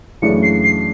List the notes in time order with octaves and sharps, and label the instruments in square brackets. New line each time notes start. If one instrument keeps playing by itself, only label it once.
[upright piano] F#2 C#3 E3 A3 D4 [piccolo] C#7
[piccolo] C7
C7